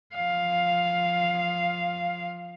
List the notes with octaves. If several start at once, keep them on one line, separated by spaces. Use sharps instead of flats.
F3 F5